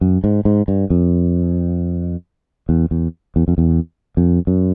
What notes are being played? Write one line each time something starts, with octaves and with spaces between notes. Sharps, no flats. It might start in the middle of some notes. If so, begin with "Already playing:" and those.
F#2
G#2
G#2
G2
F2
E2
E2
E2
F2
E2
F2
F#2